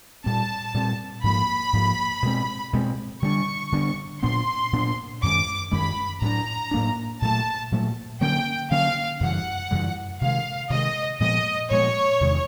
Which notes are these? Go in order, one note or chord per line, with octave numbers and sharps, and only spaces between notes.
A#2 G3 C4 A5
A#2 G3 C4
G#2 F3 A#3 B5
G#2 F3 A#3
B2 G#3 C4
B2 G#3 C4
D3 G3 B3 D4 C#6
D3 G3 B3 D4
A#2 F#3 B3 D4 C6
A#2 F#3 B3 D4
F#2 D#3 G#3 C#4 D6
F#2 D#3 G#3 C#4 B5
A2 F#3 A#3 D4 A#5
A2 F#3 A#3 D4
A#2 F#3 A3 A5
A#2 F#3 A3
D3 F#3 A#3 C#4 G5
D3 F#3 A#3 C#4 F5
F#2 C#3 E3 G3 F#5
F#2 C#3 E3 G3
C3 D#3 G#3 F5
C3 D#3 G#3 D#5
A#2 F3 G#3 B3 D#5
A#2 F3 G#3 B3 C#5
E2 C3 D#3 G#3